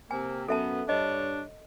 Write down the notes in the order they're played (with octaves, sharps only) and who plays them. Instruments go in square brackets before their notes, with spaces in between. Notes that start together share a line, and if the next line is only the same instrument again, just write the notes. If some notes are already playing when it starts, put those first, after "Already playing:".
[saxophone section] C3 A#3 C4 [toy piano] G#5
[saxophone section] F#2 B3 [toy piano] A4 E5 A5
[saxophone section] G2 D4 C#5 [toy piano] D#5